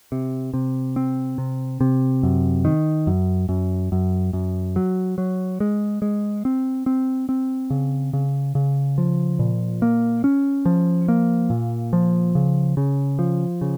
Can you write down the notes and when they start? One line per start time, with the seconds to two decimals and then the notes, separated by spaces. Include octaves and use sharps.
0.12 C3
0.54 C3
0.96 C4
1.38 C3
1.81 C3
2.23 F#2
2.65 D#3
3.07 F#2
3.49 F#2
3.92 F#2
4.33 F#2
4.76 F#3
5.18 F#3
5.60 G#3
6.02 G#3
6.45 C4
6.86 C4
7.29 C4
7.70 C#3
8.13 C#3
8.55 C#3
8.98 F3
9.39 A#2
9.82 A#3
10.24 C#4
10.65 F3
11.08 A#3
11.50 A#2
11.93 F3
12.35 C#3
12.77 C#3
13.19 F3
13.61 C#3